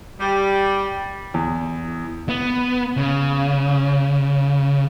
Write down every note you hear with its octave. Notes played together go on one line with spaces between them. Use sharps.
G3
E2
B3
C#3